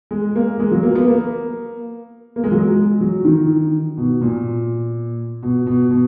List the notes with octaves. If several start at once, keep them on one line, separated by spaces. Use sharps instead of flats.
G#3
A#3
G#3
F#3
A#3
B3
A#3
A#3
G#3
F#3
G#3
F#3
D#3
B2
A#2
B2
B2
B2